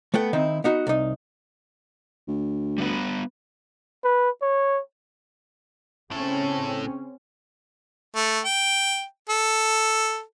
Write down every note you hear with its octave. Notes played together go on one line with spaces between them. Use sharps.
A3 B3 F#5 G5
D#3 C4 D#4 E4
B3 D#4 F#4
C2 D#4
D2
G3 B3 B4
B4
C#5
A2 C#3 C4 C#4 A4
A3
G5
A4